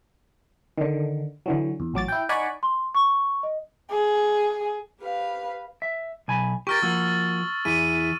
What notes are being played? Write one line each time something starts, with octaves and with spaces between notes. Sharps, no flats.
D3 D#3
D3 E3 F#3
E2
A1 F#3 D6 A6
E4 G5
D#4 D5 F#5 G#5 B5 C#6
C6
C#6
D#5
G#4
G4 B4 F5
E5
B1 G#5 B5
G4 A#4 C#6 F6 A6
F3 A#3 F#4 E6
E2 E4 G#4 D#7